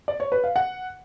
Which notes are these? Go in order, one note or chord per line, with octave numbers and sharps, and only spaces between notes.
D5
C#5
B4
F5
F#5